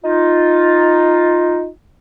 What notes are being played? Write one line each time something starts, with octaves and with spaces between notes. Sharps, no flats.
D#4 F4